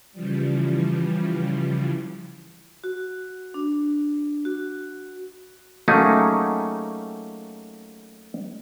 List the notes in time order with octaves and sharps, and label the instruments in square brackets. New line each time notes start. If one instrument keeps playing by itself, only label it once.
[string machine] C#3 E3 F3 G3
[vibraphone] F#4
D4
F#4
[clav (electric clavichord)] F#3 A3 A#3 C#4 D#4 G#4